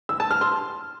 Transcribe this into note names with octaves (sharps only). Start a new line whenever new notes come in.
E6
A5
F6
C6